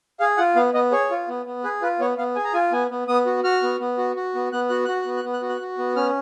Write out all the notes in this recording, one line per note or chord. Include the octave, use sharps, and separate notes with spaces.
G#4 F5
F4 F#5
B3 F5
B3 D#5
G#4 C#5
F4
B3
B3
G#4 B4
F4 B4
B3 C#5
B3 F5
G#4 G#5
A#5
F4 G#5
B3 G#5
B3
B3 D#6
F#4
F#4 F6
B3
B3
F#4
F#4
B3
B3 F#6
F#4 F#6
F#4 F#6
F#6
B3
F#6
B3
F#6
F#4
F#6
F#4
B3
C#4 F6